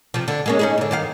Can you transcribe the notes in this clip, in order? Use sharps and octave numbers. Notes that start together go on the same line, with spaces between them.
C3 F3
D3
G#3 A#3 C#4
C#4 D#4 G#4
G#2 D3
G2 D#3 F5